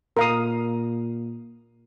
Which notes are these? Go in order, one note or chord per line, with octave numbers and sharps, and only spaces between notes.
A#2 A#4 F5 D#6